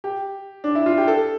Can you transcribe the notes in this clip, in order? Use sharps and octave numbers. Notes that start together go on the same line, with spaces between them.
G4
D4
E4
F4
G4
A4